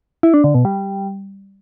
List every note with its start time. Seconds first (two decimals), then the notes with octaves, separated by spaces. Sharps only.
0.23 E4
0.34 D4
0.44 D3
0.54 B2
0.65 G3